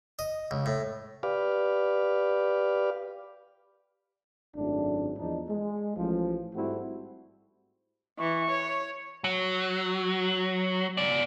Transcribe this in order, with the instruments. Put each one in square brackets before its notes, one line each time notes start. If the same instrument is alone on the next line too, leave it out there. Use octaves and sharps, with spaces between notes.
[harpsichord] D#5
C#2
A2
[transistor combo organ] G4 B4 D5 F5
[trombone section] G#1 F#2 A2 D4
E2 F3 D4 D#4
G#3
A1 F3
G#2 G3 A3 C4 E4 F#4
[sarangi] E3 [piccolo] C#6
[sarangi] C#5
[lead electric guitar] F#3
G#2 D5